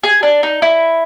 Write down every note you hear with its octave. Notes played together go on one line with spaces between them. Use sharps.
G#4
D4
D#4
E4